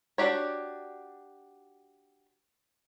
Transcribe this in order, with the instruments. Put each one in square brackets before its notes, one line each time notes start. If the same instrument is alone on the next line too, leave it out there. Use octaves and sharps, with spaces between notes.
[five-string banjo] D4 F#4 G4 C#5